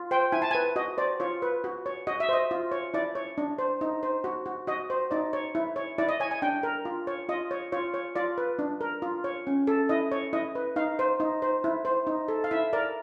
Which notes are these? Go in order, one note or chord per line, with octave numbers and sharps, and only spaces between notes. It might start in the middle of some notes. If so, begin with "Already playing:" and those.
Already playing: F4
C5 G5
E4 G#5
A5
B4 G#5
F#4 D#5
C5 D5
F4 C#5
B4
F#4
C#5
F#4 D#5
E5
C5 D#5
F4
C#5
E4 D5
C#5
D4
C5
D#4
C5
F#4
F#4
F#4 D#5
C5
D#4 D5
C#5
E4
C#5
E4 D5
D#5
C#5 G#5
G#5
D4 G5
A#4
F4
C#5
F4 D#5
C#5
F4 C#5
C#5
F4 D5
B4
D4
A#4
F4
C#5
C#4
A4
E4 D#5
C#5
E4 D#5
B4
D#4 F5
C5
D#4
C5
E4
C5
D#4
A4
F5
E4 E5
A#4 D5